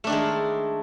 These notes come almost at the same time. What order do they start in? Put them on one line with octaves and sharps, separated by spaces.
A3 D4 D#3 G#3